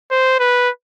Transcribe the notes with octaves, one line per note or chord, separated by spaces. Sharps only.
C5
B4